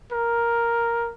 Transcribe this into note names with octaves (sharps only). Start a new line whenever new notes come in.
A#4